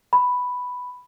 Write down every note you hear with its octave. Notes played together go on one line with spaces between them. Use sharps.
B5